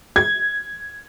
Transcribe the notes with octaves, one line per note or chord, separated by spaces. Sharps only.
G#6